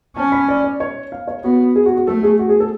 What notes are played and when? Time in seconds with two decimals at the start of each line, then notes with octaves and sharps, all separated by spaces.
0.17 C#4 A5
0.32 B5
0.48 D5
0.64 D5
0.80 C#5
1.12 F5
1.27 C#5
1.44 B3 F#4
1.75 G#4
1.86 F#4
1.97 F#4
2.07 A3 A4
2.23 G#4
2.39 F#4
2.49 G#4
2.60 A4